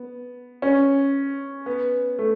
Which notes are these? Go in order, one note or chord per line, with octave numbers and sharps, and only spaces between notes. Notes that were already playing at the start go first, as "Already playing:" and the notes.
Already playing: B3
C#4
B3
A3